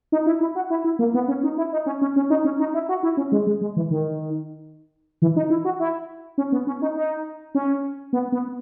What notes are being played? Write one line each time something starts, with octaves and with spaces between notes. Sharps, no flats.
D#4
E4
E4
F#4
E4
E4
A#3
B3
C#4
D#4
E4
D#4
C#4
C#4
C#4
D#4
C#4
D#4
E4
F#4
E4
C#4
G#3
G#3
G#3
E3
D#3
E3
D#4
E4
F#4
E4
C#4
B3
C#4
D#4
D#4
C#4
B3
B3